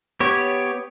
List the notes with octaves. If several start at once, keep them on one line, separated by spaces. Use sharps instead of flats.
B3 G4 C#5